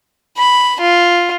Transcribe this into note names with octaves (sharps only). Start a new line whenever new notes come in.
B5
F4